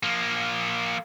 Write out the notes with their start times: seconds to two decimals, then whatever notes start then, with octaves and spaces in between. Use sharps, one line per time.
0.03 F3 A#3